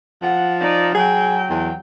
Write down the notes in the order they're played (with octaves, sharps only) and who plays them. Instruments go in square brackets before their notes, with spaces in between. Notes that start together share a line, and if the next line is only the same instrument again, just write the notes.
[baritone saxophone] F3 [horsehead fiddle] F#5
[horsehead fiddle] D#4 D5
[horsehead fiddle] F#3 G5 [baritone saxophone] G#4
[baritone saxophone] E2